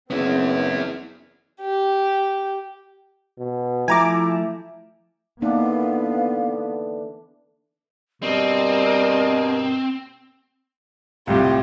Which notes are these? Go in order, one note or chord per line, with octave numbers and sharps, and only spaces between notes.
F#1 B3 C4 E4 G#4
G4
B2
F3 A3 E4 G#5 A#5 D6
D3 E3 A#3 B3 D4 D#4 F5
G2 B2 G3 C4 A#4 D#5
C2 A2 F4 G4